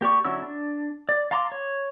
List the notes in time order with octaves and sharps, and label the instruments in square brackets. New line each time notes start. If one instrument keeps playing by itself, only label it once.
[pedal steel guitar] A#3 G4 D5 C#6
D3 F#3 C#4 E4 E6
D4
D5
F5 A5 A#5 C6 D6
C#5